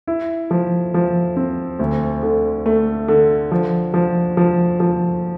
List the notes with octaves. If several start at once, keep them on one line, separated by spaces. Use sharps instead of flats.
E4
F3
F3
C4
D2
D3
A3
D3
F3
F3
F3
F3